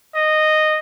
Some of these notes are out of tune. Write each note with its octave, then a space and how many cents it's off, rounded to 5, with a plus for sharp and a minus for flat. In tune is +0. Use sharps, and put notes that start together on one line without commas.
D#5 -10